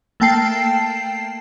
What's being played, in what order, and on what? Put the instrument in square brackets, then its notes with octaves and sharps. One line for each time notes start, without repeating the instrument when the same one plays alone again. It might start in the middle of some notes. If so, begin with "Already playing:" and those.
[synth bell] A3 A#3 G5 A5 C7